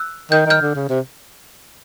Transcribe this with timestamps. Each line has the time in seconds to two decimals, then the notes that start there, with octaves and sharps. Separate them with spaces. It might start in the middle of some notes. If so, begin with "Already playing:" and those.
Already playing: E6 F#6
0.31 D#3 G6
0.46 D#3 F6 G6
0.61 D3
0.75 C#3
0.89 C3